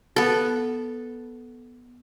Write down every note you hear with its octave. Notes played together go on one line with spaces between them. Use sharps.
B3 A4